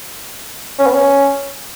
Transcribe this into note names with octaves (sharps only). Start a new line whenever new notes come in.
C#4
B3
C#4